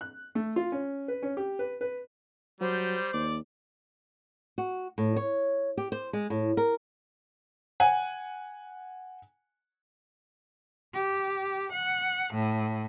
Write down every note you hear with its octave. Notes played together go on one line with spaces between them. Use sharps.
F#6
A3
F4
C#4
B4
C#4
G4
B4
B4
F#3 G3 C5
D#2 D5
F#4
A2
C#5
G4
C5
G#3
A2
A#4
F#5 G#5
G4
F#5
A2